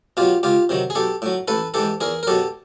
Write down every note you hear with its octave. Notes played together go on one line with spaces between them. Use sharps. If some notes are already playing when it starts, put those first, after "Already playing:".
B2 F#3 F4 G4
C#2 F4 G4
C3 D#3 F#3
G#4
B1 G4 A4
A2 F#3
A1 A4 B4
G#2 E3 G4 A4
E2 G#4 A#4
A#4
B2 F#3 G4 A4